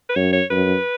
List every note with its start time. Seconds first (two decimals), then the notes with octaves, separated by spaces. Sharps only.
0.09 B4
0.16 F#2 C#5
0.33 C#5
0.50 F#2 B4